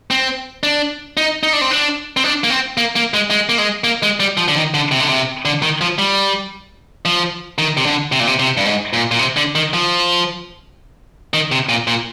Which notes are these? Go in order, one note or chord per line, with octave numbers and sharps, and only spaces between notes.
C4
D4
D#4
D#4
D4
C4
D4
C4
D4
A#3
C4
A#3
A#3
G#3
G#3
A#3
G#3
A#3
G#3
G3
F3
D3
D#3
D3
C3
D3
C3
D3
D#3
F3
G3
F3
D#3
C3
D3
C3
A#2
C3
C3
G2
G#2
A#2
A#2
C3
D3
D#3
F3
D#3
C3
A#2
A#2